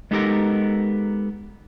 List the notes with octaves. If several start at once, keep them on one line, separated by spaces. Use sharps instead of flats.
G#3 B3 D#4 G4 A4 A#4